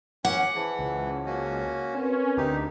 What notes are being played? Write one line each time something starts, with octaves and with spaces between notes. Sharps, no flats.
C#4 F#5 D6
E3 G#4 C5 A5
C#2
A#3 C#4 F#4
C4 C#4 A#4 B4
D2 D#4 G4